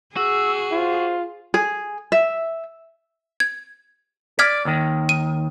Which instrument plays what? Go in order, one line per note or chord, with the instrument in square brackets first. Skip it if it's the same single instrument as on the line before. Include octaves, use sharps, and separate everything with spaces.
[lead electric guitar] F#4 [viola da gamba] G#4 [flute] E6
[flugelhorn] F4 [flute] C5
[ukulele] G#4
E5
[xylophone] G#6
[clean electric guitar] D5 [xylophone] F6 G#6 B6
[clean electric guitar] D#2 D#3
[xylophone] D#7